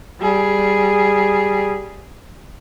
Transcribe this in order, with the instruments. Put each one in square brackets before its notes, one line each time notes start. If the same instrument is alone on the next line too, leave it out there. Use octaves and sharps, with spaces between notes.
[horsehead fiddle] G3 G#4